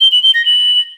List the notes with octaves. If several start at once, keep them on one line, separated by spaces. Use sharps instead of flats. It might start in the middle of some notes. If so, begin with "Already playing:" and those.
G7
F#7
G7
A#6
F#7